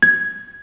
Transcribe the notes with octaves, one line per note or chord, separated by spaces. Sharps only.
G#6